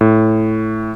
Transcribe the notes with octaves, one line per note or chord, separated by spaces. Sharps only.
A2